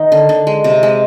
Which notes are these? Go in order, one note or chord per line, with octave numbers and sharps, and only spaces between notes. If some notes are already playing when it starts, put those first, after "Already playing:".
Already playing: D#3 D#4
D3
D3
G#3
C3
G#3